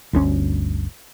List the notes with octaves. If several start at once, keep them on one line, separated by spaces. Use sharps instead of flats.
G1 D2 C#4